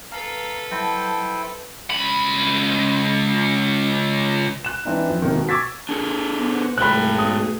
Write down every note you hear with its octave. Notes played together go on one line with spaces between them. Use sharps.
A4 B4 F5 A#5
F#3 E4 C5 G5 A5
C#2 B5
F#6 E7
E3 C4 D4 D#4
F2
E1 C3 D#3
B2
C#6 D6 E6 G#6 A6 B6
D4 G#4 A4
B3 C5 F#5 F#6
C2 G#2 G#3 A3 G#4 G5 B5 F#6
B1 D#6